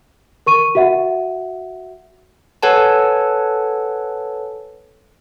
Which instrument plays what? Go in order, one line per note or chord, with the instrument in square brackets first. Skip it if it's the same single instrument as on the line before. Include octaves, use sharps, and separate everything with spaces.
[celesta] A#4 C#6 D#7
F#4 E5 F#5
[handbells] A4 B4 C#5 F#5 G#5 A5